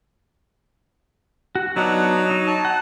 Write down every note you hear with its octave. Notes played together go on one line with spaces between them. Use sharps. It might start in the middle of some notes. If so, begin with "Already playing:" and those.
F#4
F#3 B3 D4 D#4 F#5
D#4
A5
F#5